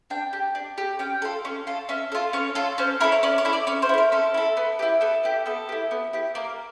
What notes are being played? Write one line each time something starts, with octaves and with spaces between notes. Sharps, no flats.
D4 G5
G4
D4
G4
C#4 G5
F4 A4
C#4
F4 A4
C#4 E5
F4 A4
C#4 C#5
F4 A4
C#4 C5
E4 A4 A#4
C#5
C#4 D5
C#5
E4 A4
D5
C#4 C#5
C5
E4 A4
A#4
C#4 A4
E4 A4
B3
E4 G4
B3 A4
E4 G4
B3 A4
E4 G4
B3
E4 G4
A#3 A#4